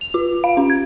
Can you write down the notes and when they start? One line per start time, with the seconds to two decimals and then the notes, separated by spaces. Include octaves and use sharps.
0.01 F7
0.14 F4
0.44 F5
0.57 C#4
0.70 G#6